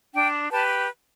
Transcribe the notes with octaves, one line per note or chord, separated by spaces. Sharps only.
D4 G5
G4 B4 A5